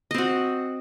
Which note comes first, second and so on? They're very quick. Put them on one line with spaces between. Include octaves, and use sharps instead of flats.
D#5 C4 F#4